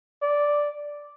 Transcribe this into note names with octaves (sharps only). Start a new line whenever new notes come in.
D5